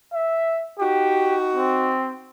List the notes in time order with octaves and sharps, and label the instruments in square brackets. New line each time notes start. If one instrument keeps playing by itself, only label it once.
[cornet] E5
[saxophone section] D#4 F#4 [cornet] G4
[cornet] C4